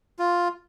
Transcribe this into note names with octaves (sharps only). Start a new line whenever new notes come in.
F4